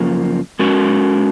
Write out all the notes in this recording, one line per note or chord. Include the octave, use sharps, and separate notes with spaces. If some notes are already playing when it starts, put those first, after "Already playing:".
Already playing: F#2 C#3 F3 A#3
G#3 C#4 F#4 A#4